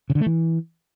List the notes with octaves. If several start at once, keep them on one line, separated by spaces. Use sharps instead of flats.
C#3
D3
A3
E3